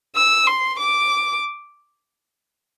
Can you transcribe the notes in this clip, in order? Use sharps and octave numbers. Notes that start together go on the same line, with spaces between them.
E6
C6
D6